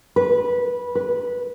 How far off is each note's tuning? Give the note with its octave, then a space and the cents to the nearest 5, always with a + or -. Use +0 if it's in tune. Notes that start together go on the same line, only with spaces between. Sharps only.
B4 -15
B4 -15